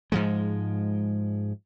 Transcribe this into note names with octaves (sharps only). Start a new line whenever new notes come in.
G#2 F3 G#3